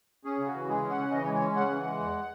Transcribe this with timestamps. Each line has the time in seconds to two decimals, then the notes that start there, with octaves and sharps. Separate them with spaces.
0.25 C#4 G#4
0.39 C#3
0.47 F#4
0.54 E3
0.68 G#3 G#4
0.82 C#4
0.90 F#5
0.98 C#3
1.11 E3 D#5
1.23 C#5
1.27 G#3
1.34 C#5
1.41 C#4
1.56 C#3 F#5
1.70 E3
1.84 G#3
2.00 E2